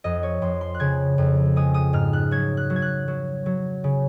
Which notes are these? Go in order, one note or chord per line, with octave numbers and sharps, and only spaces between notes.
F2 D#5
C#5
F2 C6
C6
F#6
C#3 G#6
F2
G#3 D#6
D#6
G#2 F6
F#6
F#3 G#6
F#6
F#3
G#6
F#6
F#3
F#3
C#3